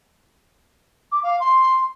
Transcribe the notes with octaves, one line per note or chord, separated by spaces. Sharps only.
D6
F5
C6